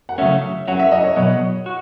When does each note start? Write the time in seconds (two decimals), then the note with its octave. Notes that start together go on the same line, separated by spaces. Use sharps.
0.09 F#5
0.18 C#3 F#3 A3 C#4 E5
0.68 F#3 C#4 F#4 F#5
0.79 E5
0.92 D#5
1.04 C#5
1.16 B2 F#3 B3 D#5
1.66 F#4